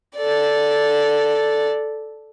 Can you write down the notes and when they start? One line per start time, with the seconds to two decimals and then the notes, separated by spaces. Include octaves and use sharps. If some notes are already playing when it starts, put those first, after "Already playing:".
0.16 A4 D5